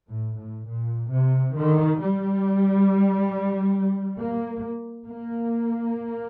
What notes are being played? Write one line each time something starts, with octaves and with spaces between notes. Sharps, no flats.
A2
A2
A#2
C3
D#3
G3
A#3
A#3